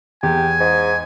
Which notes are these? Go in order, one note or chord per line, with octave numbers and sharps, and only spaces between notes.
E2 G4 G#5
G#2